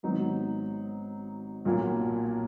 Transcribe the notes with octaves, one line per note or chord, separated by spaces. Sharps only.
G#1 G#2 F#3 B3 D#4
B1 A#2 F#3 A#3